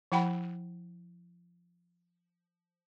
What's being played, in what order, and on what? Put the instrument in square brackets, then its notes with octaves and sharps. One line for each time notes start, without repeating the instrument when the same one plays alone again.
[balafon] F3 E4 F#5 G5 B5